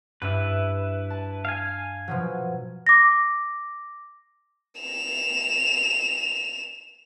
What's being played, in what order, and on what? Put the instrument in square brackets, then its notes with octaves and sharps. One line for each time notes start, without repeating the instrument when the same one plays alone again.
[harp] G2 D4 E5 [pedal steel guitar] E4 B4
[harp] A5
[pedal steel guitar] F5 G#5
[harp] B2 F3 F#3
[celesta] D6 A#6
[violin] E7 F7